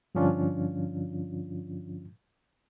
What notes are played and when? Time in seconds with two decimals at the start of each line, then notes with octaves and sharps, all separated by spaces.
0.15 G2 D3 F3 C#4 D4 F4